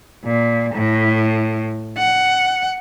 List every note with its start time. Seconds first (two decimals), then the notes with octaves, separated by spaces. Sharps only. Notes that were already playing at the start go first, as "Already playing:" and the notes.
0.24 A#2
0.74 A2
1.97 F#5